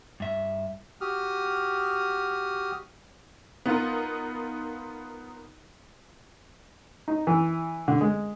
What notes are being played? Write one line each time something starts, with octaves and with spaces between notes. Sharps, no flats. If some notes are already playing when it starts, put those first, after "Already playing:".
G2 E5
F#4 G4 D#6 F6
B3 D#4 F4 A#4
D#4
E3
D3
G#3